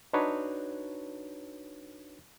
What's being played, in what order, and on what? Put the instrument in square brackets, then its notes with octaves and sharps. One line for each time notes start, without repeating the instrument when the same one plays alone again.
[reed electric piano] D4 D#4 F#4 B4 C#5